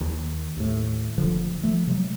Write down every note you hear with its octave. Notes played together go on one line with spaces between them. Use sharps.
D#2
D#2 A2
F#1 D3 F3
F3 A3
C3 F#3 G#3